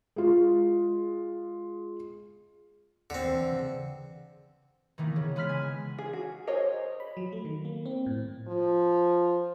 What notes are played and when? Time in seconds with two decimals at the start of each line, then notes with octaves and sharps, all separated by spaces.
0.16 G#3 F4
3.10 D#2 D3 C4
3.25 E3
3.52 C#3
4.98 D#3 E3 A#3 B3
5.16 C#3
5.36 G#3 B3 B5 F6 B6
5.49 G#5
5.98 G#4
6.13 F#4
6.47 G#4 A#4 C5 C#5 D#5
7.00 B5
7.17 F#3
7.33 A3
7.45 D#3
7.65 A#3
7.86 C4
8.06 A2
8.47 F3